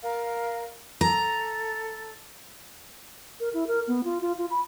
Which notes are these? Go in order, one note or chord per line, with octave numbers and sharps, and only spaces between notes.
A#4 F5
A4 A#5
A#4
E4
A#4
B3
F4
F4
F4
B5